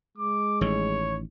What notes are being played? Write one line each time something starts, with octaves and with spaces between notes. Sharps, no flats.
G#3 D6
A1 D#3 C#5